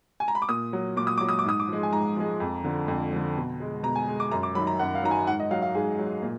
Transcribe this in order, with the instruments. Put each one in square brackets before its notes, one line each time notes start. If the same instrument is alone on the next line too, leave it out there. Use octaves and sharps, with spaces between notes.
[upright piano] G#5
A#5
B5
D6
A#2 D#6
F#3
A#2 D6
D#6
F#3 D6
D#6
D6
G#2 D#6
D6
F3 G#3
G#5
G#2 A#5
F3 G#3
F2
D3 F3
F2
D3 F3
B2
G#3
B2 A#5
G#5
G#3
D6
F#2 A#5
D6
D#3 F#3 B5
A#5
F#2 F#5
F5
D#3 F#3 A#5
G#5
G#2 F#5
D#5
F#3 F5
F5
G#2 G#4
F#3
A#2